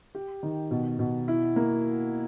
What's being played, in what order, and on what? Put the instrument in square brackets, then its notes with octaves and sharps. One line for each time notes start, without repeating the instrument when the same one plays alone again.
[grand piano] G4
D#3
B2
B2
E4
A#3